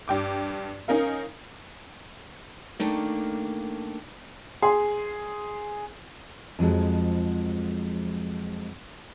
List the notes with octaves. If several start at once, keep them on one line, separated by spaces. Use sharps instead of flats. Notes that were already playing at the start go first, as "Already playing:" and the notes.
G2 G5 D6
C#4 D#4 A#4 F5
D#3 A3 A#3 D4
G#4 C6
F2 F3 F#3 G#3